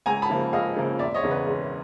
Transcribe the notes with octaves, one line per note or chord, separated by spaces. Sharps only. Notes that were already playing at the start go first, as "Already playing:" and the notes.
C#2 G#5 A#5
A5 B5
C#3 F3 A#3
C#2 D#5 F5
C#3 F3 A#3
E1 D5 E5
C#5 D#5
E2 C#3
B4
E1